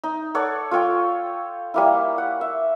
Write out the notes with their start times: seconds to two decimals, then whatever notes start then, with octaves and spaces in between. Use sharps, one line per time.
0.04 D#4
0.34 A4 C#5 D5 F#5
0.71 F4 A4 C#5 G5
1.74 G3 A#3 E4
2.18 F#5
2.41 E5